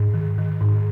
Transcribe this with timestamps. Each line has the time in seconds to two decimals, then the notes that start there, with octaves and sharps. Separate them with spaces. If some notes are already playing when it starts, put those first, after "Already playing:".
Already playing: G#2
0.14 D#3
0.38 D#3
0.61 G#2